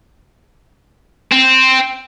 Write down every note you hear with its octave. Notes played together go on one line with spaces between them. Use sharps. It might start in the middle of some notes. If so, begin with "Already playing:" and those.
C4